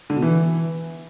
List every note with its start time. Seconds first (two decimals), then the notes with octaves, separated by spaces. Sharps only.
0.10 D3
0.16 B2
0.22 E3